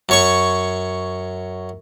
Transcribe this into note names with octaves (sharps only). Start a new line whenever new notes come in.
F#2 C#5 C#6